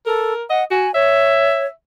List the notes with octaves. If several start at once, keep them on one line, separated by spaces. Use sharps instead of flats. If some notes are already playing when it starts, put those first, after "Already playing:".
A4 A#4
D#5 F#5
F#4 G#5
C#5 E5